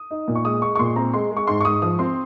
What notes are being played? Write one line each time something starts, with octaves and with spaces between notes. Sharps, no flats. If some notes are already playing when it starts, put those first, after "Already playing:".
Already playing: D#6
D#4
A#2
C#6
G#3 D#6
G#3 C#6
C#6
A#2 C6
C4 A#5
G#3 C6
G#3
C#6
G#2 C6
C#6
G#2 D#6
F3 D#6
C4 C6